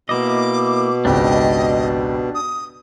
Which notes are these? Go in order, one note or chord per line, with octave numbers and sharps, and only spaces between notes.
B2 A#3 E4 D#5 D6
G#1 C#2 D4 G4 D#5
D#6